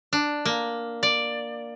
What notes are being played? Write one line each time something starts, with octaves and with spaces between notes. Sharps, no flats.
D4
A#3
D5